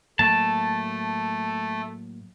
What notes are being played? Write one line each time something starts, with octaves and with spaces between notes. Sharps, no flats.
A2 F#3 A3 A#3 A5